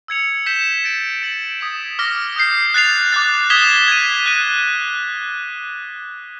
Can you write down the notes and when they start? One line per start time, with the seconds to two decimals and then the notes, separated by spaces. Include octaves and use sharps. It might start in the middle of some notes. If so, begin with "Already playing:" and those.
0.08 E6 G#6 C#7 F7
0.46 G6 B6 E7 G7
0.84 A6 D7 F#7
1.22 A6 D7 F#7
1.60 D#6 G#6 B6 E7
1.99 D6 F6 A#6
2.36 D#6 G6 C7
2.74 F#6 A6 C7 F7
3.12 D6 F#6 A6
3.50 D#6 G#6 B6 E7 G7
3.88 G#6 B6 D#7
4.26 F#6 A#6 D#7